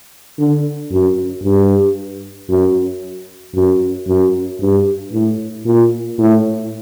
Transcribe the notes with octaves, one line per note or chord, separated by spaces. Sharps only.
D3
F#2
G2
F#2
F#2
F#2
G2
A2
A#2
A2